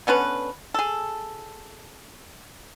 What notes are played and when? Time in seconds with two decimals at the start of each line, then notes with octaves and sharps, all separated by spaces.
0.07 D3 B3 C#4 B4
0.74 G#4 A4